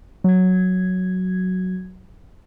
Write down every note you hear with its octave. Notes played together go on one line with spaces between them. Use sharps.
F#3 G#6